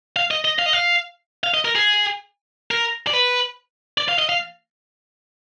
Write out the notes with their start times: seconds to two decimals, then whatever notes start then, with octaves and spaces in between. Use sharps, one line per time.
0.16 F5
0.31 D#5
0.45 D#5
0.59 F5
0.66 D#5
0.73 F5
1.44 F5
1.54 D#5
1.65 A#4
1.75 G#4
2.71 A#4
3.07 D5
3.13 B4
3.98 D5
4.09 F5
4.19 D#5
4.29 F5